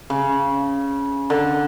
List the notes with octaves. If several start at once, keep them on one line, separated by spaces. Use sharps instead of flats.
C#3
D3